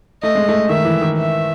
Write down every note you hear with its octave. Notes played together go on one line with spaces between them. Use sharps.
A3 D#5
G#3
A3
D#3 E5
E3
D#3
E5